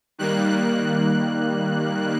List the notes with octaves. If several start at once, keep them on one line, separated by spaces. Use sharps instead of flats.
D#3 G3 A#3 F#6